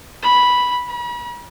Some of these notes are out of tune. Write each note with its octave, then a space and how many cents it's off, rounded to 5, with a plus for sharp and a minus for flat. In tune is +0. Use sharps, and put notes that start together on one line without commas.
B5 -5
B5 -40